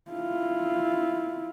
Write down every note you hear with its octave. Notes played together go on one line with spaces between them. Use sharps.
E4 F4